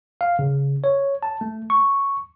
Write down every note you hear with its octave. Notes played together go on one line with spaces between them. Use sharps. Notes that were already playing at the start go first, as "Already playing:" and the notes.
F5
C#3
C#5
A5
A3
C#6